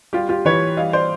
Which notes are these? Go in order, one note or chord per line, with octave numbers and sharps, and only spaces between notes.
G3 F4 G4
F4 G4
E3 B4 C#5
G3 D#5 F5
C5 D5